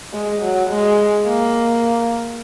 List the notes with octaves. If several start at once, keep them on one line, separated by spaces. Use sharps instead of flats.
G#3
F#3
G#3
A#3